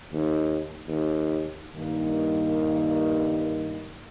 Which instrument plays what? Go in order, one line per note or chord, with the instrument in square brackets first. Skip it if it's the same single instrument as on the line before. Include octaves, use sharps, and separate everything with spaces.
[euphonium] D#2
D#2
[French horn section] G2 D#3 A#3